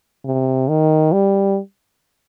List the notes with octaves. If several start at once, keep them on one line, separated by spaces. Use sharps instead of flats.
C3
D#3
G3